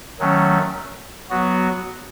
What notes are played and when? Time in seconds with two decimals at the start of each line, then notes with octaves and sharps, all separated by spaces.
0.19 D#3 F#3 A3 C#4
1.30 F#3 B3 F#4